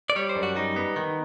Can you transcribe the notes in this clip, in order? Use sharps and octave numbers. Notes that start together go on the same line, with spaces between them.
D5
G3 C#5
C5
F#2
F#4
G3 D#4
B3
D#3